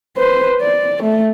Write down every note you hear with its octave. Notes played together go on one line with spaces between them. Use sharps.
B4 C5
D5
A3